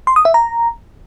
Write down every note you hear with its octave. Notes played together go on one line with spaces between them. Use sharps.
C6
D#6
E5
A#5